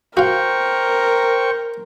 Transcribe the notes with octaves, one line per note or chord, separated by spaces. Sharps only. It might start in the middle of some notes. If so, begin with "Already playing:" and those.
F#4 A#4 C5 F5 G5 C#6